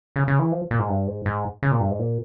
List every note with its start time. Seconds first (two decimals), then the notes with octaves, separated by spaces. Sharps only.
0.16 C#3
0.28 C#3
0.39 E3
0.52 F3
0.71 A#2
0.79 G#2
0.89 G2
1.07 G#2
1.26 G#2
1.63 C#3
1.71 A#2
1.80 G2
1.91 G#2
1.99 A#2